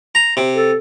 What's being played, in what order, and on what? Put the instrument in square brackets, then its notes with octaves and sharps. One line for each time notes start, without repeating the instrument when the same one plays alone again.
[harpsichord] A#5
C3
[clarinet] A4